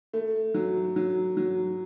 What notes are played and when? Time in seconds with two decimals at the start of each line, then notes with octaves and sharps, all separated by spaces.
0.13 A3
0.54 F#3
0.96 F#3
1.37 F#3